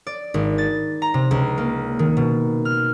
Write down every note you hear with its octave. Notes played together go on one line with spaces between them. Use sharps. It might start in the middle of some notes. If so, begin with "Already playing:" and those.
D5
G#1
A6
A#5
C3
C#2
A#3
D#3
B2
F6